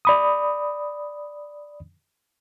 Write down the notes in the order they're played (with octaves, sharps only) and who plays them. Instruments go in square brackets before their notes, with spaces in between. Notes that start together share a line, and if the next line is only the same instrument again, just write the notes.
[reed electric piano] D5 B5 D#6